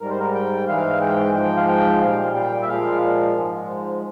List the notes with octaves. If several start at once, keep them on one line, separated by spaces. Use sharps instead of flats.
G#2 G3 A#4
C5
A#4
G5
G#2 E3 G#3 F5
G5
G#2 F3 G#3 G5
F5
G5
A#2 G3 F5
G5
E5
A#2 F3 G#3 F5
G#2 F3 G#3